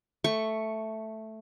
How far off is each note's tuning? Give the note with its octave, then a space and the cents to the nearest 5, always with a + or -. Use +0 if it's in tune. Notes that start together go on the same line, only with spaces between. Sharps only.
A3 +0 C#6 +0